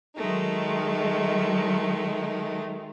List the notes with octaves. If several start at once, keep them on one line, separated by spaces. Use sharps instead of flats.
D#3 F#3 G#3 A3 D#4